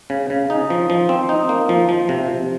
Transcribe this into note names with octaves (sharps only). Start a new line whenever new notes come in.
C#3
C#3
D#4
F3
F3
C4
D#4
A#3
F3
F3
C3